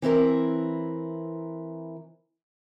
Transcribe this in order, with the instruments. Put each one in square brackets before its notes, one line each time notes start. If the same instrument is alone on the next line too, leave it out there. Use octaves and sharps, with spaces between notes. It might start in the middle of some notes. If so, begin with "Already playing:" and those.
[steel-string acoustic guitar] E3 C4 E4 A#4